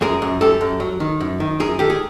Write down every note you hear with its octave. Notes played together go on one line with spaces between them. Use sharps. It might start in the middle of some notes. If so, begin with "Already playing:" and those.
F#2 G#4 A#4
F#2
F#2 G4 A4
F#2
F#3
D#3
F#2
D#3
F#2 G#4 A#4
D#3 G4 A4
G#4